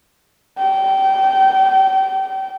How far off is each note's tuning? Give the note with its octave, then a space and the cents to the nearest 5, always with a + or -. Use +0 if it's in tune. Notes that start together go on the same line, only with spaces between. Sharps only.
G5 -25